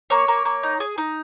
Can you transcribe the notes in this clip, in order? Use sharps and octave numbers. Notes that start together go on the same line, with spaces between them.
A#3 C#5
A#3
A#3
D#4
G#4
D#4